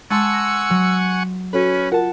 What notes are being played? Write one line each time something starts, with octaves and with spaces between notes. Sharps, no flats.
G#3 F#5 G#5 A5 C6 C#6 E6 A6
A#6
F#3
C#4 F#4 A4 B4
F4 A#4 F#5 A5